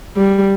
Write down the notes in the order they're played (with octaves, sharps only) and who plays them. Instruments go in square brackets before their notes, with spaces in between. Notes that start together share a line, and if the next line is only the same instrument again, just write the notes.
[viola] G3